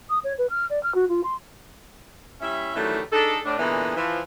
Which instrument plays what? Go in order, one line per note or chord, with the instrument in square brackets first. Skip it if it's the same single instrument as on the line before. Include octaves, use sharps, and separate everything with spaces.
[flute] D#6
C#5
B4
F6
D5
F6
F#4
F4
C6
[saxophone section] G3 C#4 E4 E5
D#3 E3 F#3 G3 A3 C#4
D4 D#4 G#4 A4
A2 D4
A#2 D3 E3 G#3 B3
E3 F3